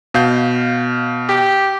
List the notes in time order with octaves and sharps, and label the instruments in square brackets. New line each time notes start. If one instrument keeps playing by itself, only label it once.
[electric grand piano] B2 F5 G6
[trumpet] G4